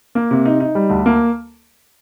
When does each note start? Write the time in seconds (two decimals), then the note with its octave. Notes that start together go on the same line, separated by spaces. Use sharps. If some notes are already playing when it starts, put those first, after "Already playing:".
0.15 A#3
0.31 C3
0.45 D#4
0.60 D#4
0.75 G3
0.90 D2
1.06 A#3